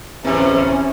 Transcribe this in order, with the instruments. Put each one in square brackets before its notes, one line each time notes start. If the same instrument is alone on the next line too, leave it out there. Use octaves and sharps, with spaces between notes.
[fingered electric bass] D1 G1 C4 [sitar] E2 C3 [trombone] E3 [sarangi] C#4